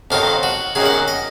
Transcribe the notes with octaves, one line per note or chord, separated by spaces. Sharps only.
F2 D#3 F#3 F4
F#4
F#2 D#3 F#3 G#4
F#5
D#5